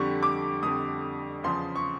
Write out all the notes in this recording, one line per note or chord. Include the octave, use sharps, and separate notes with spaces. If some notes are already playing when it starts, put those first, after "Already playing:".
Already playing: F2 D3 G3 C#6
D6
F2 D3 G3 D#6
E2 C#3 F3 C6
C#6